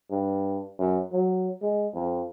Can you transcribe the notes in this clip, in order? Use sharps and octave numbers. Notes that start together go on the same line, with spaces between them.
G2
F#2
F#3
G#3
F2